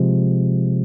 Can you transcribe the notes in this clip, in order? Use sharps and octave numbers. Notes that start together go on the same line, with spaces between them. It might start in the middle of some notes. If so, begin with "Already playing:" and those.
Already playing: C3 F3 G#3